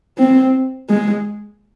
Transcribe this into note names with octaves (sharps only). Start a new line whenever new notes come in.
C4
G#3